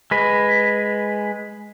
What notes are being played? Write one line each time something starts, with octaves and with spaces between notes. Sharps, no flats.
G#3 B4